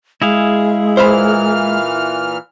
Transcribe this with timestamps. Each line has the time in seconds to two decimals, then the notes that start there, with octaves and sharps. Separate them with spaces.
0.22 G#3 E4 G#4 F5
0.97 A#2 E3 C5 E5 B5 F6